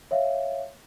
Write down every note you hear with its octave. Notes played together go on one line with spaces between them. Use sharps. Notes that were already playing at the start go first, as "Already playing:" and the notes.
C#5 E5 F5